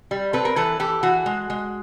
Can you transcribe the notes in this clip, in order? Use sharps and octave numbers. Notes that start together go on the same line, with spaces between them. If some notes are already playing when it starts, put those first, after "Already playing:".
G3
C4 A4 B4
A#4
E3 A4 B4
E3 G4 A4
E3 F#4 G#4
G#3
G#3